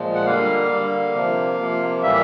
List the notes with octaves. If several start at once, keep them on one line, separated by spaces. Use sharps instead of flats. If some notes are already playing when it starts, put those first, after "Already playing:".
Already playing: A#2 F3 G#3
F#5
D3 G3 A#3 F5
D3 G3 A#3
C3 F3 A#3
C3 F3 A#3
A2 E3 G3 A#3 E5